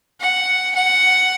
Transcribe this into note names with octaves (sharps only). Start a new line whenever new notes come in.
F#5
F#5